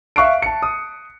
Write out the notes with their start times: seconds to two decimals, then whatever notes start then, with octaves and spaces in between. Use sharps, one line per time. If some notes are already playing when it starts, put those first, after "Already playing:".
0.16 E5 F5 C#6 F#6 C7 D7
0.42 A5 C#7
0.62 D#6